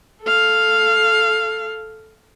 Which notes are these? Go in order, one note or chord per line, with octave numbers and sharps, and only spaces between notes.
A4 F5